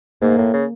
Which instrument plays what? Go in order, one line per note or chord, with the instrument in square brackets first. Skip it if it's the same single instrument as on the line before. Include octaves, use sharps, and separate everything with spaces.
[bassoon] G#2 [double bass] A#3
[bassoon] A2
C#3